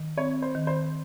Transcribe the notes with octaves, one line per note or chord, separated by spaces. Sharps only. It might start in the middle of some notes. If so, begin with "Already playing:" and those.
Already playing: D#3
C4 C#5
C5
D#3
C5